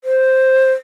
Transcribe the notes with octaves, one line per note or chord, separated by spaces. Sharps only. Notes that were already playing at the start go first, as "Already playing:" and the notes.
C5